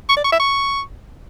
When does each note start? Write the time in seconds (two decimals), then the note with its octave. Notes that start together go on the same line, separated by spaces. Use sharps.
0.09 C#6
0.17 D5
0.25 C#6
0.32 E5
0.40 C#6